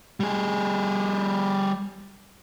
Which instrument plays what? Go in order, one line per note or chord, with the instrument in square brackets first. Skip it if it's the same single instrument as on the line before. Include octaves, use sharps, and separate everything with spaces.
[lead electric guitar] G3 G#4